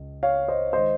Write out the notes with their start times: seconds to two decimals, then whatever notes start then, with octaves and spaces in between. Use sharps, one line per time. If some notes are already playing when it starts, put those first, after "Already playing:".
Already playing: C#2
0.23 C#5 F5
0.48 C5 D#5
0.73 D#3 G#3 C5 D#5